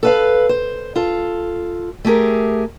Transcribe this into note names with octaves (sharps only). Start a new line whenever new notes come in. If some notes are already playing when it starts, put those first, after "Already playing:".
A4 B4 F5
C5
F4 A4
A3 G4 G#4 A#4